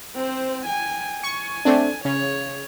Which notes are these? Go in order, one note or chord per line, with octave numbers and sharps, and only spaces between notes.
C4 C5
G5 G#5
G#5 C#6
A3 C4 D4
C#3 C#5